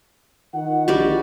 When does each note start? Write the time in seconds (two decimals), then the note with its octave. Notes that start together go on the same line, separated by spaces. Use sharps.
0.54 D#3 D#4 F4 F#5
0.88 A#1 G3 F#4 D5